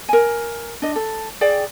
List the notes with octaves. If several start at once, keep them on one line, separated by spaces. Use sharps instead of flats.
A#4 G#5
D4 D#5
A4
G#4 D5 G5